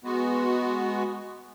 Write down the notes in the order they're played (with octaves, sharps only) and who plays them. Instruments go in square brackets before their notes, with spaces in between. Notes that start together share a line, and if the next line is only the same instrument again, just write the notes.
[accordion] G#3 B3 F#4